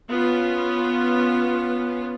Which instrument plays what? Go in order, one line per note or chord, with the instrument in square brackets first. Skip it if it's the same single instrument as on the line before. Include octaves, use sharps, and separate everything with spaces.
[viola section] B3 C#4 F4